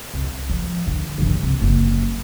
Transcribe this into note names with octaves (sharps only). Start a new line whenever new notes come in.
C2
F3
D3
G2 E3
C2
F#1 F#3